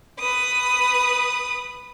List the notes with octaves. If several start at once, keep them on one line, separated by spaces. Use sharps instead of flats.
B4 D#6